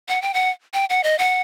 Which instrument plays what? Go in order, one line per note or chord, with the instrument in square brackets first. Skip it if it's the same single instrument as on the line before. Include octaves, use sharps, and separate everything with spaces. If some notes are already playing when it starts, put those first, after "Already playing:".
[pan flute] F#5
G5
F#5
G5
F#5
D#5
F#5